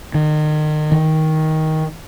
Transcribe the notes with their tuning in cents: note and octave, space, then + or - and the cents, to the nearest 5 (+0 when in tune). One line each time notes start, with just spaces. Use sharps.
D#3 -35
D#3 +15